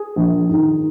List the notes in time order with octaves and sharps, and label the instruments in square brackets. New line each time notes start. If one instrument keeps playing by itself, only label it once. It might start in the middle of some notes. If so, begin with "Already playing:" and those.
Already playing: [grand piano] G#4
[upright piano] A#1
G#2 D#3